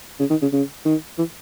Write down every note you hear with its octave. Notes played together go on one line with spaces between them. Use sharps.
C#3
D#3
C#3
C#3
D#3
E3